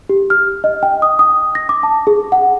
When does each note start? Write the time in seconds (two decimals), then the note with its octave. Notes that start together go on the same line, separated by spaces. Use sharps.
0.09 G4
0.30 F6
0.64 D#5
0.83 G5
1.02 D#6
1.19 D#6
1.55 A#6
1.69 D6
1.83 A5
2.07 G#4
2.32 F#5